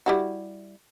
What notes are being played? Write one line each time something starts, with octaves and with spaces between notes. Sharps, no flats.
G3 E4 F#4